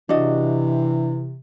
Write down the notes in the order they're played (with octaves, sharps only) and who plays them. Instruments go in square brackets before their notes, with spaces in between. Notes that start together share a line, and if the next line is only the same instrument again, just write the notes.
[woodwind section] C3 [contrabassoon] E3 [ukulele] D4 F#4 D#5